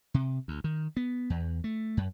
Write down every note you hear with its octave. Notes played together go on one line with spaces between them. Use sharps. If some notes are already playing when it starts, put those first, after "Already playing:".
C3
D2
D#3
B3
E2
A3
F#2